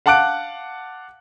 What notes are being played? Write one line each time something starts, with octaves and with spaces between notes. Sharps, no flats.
F5 F#5 A5 D6 F#6 D7